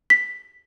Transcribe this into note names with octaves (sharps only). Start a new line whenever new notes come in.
B6